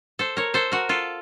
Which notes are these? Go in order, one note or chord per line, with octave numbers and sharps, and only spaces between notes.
A4 C5
A#4 C#5
A4 C5
F#4 A#4
F4 A4